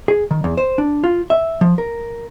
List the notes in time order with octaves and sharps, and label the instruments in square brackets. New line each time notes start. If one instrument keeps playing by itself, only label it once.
[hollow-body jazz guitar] G#4
D#3
E2
C5
D4
F4
E5
F3
A#4